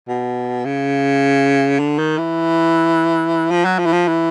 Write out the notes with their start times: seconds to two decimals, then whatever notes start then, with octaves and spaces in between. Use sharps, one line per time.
0.08 B2
0.65 C#3
1.79 D3
1.98 D#3
2.18 E3
3.50 F3
3.65 F#3
3.79 F3
3.85 E3
3.92 F3
4.07 E3